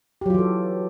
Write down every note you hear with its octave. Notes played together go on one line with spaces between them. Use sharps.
E3 F#3 F4 G4 A4